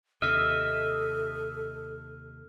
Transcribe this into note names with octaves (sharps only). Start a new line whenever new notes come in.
D#2 C3 A4 D#5 E5 F6